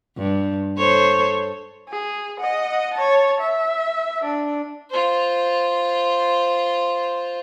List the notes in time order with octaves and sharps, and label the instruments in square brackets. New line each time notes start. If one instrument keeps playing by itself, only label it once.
[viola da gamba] G2
A4 C5 C#5
[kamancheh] G#4
D#5 F#5
C#5 A5
E5
D4
[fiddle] F4 C5